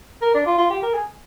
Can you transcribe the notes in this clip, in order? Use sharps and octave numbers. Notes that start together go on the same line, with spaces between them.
A#4
D4
F4
F4
G4
A#4
G#4